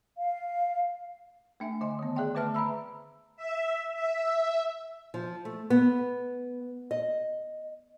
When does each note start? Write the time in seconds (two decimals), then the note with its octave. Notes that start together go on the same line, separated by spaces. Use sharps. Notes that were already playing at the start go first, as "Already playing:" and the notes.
0.18 F5
1.60 A3 D4 E5 G#5
1.81 D3 D#5 G#5 C6
1.99 D#3 B3
2.16 G#4 D5 E5 G5 C6
2.35 D3 A3 B4 E5 A5 F6
2.54 E5 A#5 B5 E6
3.36 E5
3.93 E5
5.14 F3
5.45 A3
5.70 B3
6.91 D#5